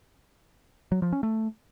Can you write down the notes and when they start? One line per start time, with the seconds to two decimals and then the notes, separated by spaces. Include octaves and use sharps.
0.92 F#3
1.02 F3
1.13 C#4
1.23 A3